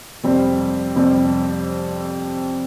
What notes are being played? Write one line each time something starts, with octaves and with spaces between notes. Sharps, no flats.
F2 C3 G3 C4
F2 C3 G3 C4